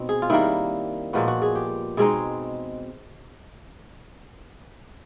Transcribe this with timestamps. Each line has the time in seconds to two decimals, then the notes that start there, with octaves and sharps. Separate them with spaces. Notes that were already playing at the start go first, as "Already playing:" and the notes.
Already playing: B2 C4 D#4
0.09 G#4
0.22 F4
0.30 D#3 G3 A#3 E4
1.13 A#2 F3 G#3 B3 F#4
1.28 F#4
1.42 G#4
1.55 G4
1.97 B2 G#3 C4 D#4 G#4